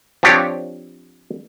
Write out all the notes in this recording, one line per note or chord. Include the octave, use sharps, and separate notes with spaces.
F3 C4 D4 G4 C#5